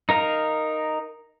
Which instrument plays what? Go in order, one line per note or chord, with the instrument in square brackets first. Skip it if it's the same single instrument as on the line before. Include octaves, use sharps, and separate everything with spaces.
[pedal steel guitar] D#4 A#4 F5